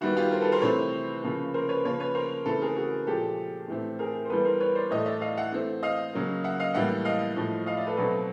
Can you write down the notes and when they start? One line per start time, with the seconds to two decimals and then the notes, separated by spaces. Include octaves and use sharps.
0.01 D#3 G3 B3 E4 F#4
0.16 F4 G4
0.31 A#4 C5
0.42 A4 B4
0.52 A#4 C5
0.62 C3 E3 A3 C4 B4 C#5
1.23 C#3 F3 A#3
1.54 A#4 C5
1.69 B4 C#5
1.84 C#3 F3 A#3 B4 C#5
2.00 B4 C#5
2.15 A#4 C5
2.45 C#3 E3 A3 C4 A4 B4
2.61 G#4 A#4
2.77 F#4 G#4
3.07 A#2 F3 G#3 G4 A4
3.68 A2 E3 A3 C4
3.99 G#4 A#4
4.25 C5
4.30 E3 G3 B3 A4 B4
4.45 A#4 C5
4.60 B4 C#5
4.75 C5 D5
4.90 A2 E3 A3 C#5 D#5
5.06 D5 E5
5.21 D#5 F5
5.37 E5 F#5
5.53 E3 A3 C4
5.83 D#5 F5
6.13 C#3 F#3 A#3
6.44 E5 F#5
6.60 D#5 F5
6.74 A2 E3 G3 A#3 E5 F#5
7.05 D#5 F5
7.36 A2 F3 A3
7.66 D#5 F5
7.77 D5 E5
7.87 A4 B4
7.97 B2 F#3 A3 C4 A4 B4